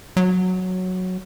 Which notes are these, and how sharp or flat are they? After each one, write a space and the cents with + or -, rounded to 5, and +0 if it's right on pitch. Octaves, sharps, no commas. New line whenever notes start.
F#3 -5